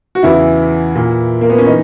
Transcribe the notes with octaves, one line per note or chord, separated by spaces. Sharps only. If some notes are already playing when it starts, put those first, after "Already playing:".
F#4
E2 C#3 E3 E4
A#2
A#3
B3
C#4
E3 D#4